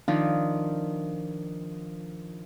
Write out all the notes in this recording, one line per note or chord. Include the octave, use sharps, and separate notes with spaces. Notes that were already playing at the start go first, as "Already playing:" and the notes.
D#3 F3 D4 D#4 F4